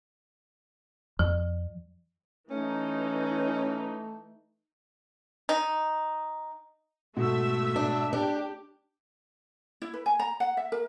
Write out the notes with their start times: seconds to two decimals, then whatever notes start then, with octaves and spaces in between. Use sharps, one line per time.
1.19 F2 F3
2.50 E3 A3 C#4 D#4
5.49 D#4
7.17 G#2 B2 A3 E5
7.76 D4
8.13 D4 G4
9.82 E4
9.94 B4
10.06 G#5
10.19 A#5
10.40 F#5
10.57 E5
10.72 A#4